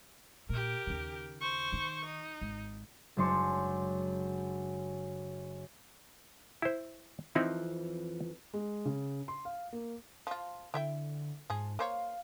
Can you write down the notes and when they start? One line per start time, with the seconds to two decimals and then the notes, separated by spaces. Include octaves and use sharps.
0.49 A#2 G4 A#4
0.87 D#2 C#3
1.41 C5 C#6
1.72 D#3
2.06 D#4
2.41 G#1
3.17 F#1 F#2 G#3 D4 C6 C#7
6.62 E4 C5
7.35 F2 E3 F3 C4 D#4 E4
8.53 G#3
8.85 C#3
9.28 C6
9.45 F5
9.73 A#3
10.27 F3 F4
10.74 D3 E4 E5 G5
11.50 G#2 F3 G#4
11.79 A#3 C5 C#5 F5